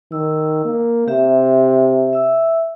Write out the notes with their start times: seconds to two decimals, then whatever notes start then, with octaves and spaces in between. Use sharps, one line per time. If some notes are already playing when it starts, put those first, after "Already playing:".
0.12 D#3 E6
0.65 A#3
1.08 C3 G4 E5
2.13 E5 E6